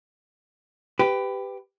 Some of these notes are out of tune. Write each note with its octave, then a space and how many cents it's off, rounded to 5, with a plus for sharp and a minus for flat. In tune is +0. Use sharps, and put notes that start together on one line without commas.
G4 +0 B4 +20